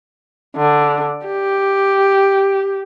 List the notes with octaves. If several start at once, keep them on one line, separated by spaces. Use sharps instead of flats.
D3
G4